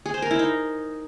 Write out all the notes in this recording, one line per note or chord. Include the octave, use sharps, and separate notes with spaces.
G#4
C5
A#4
E4
D#4